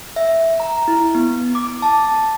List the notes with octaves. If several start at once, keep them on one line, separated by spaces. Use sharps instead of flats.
E5
A#5
E4
B3
D6
A5